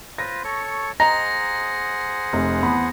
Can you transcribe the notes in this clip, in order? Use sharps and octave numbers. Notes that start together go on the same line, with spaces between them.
F4 B4 C5 A#6
A4 C#5 C#6
G#4 C5 D#5 F#5 A#5 A#6
F1
E2 B3 B5